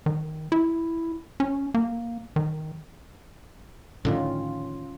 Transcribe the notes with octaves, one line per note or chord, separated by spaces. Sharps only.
D#3
E4
C#4
A#3
D#3
A2 D3 D#3 C#4 F4